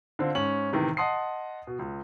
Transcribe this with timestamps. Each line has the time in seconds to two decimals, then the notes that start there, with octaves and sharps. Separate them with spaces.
0.19 D3 C4 F4
0.35 G#2 C#4 F#7
0.72 A2 C3 D#3 E3
0.97 D#5 F#5 A5 C6 D#6 C7
1.67 B2
1.79 C#2